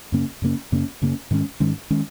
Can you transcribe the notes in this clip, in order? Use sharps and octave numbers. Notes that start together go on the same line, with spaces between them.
F#2 C#3 A#3 C#4
F#2 C#3 A#3 C#4
F#2 C#3 A#3 C#4
F#2 C#3 A#3 C#4
G#2 D#3 G#3 C#4
G#2 D#3 G#3 C#4
D#3 G#3 C#4